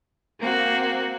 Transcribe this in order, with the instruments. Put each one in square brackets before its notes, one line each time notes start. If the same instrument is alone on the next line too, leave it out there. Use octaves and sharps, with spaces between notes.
[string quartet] A#3 C4 F#4